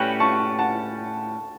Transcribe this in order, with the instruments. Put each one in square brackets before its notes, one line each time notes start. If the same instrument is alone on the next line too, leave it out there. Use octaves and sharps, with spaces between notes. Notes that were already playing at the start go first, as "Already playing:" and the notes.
Already playing: [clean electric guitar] A2 G3 C#4 F#4 B4 [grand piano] G5
[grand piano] A5 C#6
F#5 A5